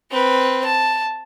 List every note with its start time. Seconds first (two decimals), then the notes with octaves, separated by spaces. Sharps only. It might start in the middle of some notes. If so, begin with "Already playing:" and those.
0.11 C4 B4
0.64 A5